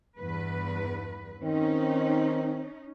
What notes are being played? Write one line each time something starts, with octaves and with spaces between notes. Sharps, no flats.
E2 G2 B4
D#3 C4 C#4 D#4